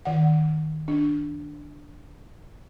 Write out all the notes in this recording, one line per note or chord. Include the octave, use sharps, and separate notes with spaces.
D#3 F#5
D4